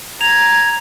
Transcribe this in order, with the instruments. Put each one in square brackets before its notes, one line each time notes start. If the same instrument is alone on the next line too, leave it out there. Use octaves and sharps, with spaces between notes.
[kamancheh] A#5 [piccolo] G#6 [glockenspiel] F7